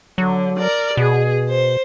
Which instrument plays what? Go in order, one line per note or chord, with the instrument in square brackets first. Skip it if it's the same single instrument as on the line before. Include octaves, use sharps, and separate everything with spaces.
[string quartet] D3 [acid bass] F#3
[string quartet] A#4 D5
[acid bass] B2 [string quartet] G#4
[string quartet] C5